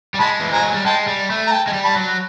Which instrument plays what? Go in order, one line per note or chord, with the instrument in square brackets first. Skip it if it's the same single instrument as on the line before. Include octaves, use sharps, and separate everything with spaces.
[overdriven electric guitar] G3
[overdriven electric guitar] G#3 [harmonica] A5 B5
[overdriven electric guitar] E3
[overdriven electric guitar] F3 [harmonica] G#5 A#5
[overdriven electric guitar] F#3
G3
[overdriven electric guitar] G#3 [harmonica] G5 A5
[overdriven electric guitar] G3
A3
[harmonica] A#5
G5 A5
[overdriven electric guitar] G#3
G3
[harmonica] A5 B5
[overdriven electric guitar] F#3